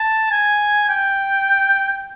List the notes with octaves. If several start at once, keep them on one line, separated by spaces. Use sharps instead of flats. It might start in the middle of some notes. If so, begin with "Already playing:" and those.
Already playing: A5
G#5
G5